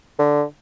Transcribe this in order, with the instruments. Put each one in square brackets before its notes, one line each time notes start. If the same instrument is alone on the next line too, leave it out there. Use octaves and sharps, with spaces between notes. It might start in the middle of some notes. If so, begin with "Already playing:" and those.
[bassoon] D3